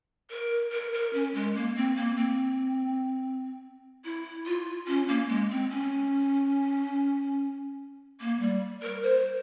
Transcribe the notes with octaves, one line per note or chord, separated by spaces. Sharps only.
A#4
A#4
A#4
C#4
G#3
A#3
C4
A#3
C4
E4
F4
C#4
A#3
G#3
C4
C#4
A#3
G3
A#4
C5